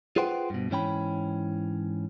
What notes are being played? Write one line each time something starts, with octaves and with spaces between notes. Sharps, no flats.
F4 G#4 B4 C5 F#5 G5
G2 B2
G#2 E3 C#4 G5 B5